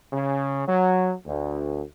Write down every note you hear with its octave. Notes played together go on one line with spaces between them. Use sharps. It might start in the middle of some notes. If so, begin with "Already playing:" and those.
C#3
F#3
D2